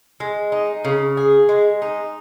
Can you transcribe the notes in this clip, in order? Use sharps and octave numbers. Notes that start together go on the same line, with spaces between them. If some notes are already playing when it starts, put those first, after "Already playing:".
G#3
D#4
C#3
G#4
G#3
D#4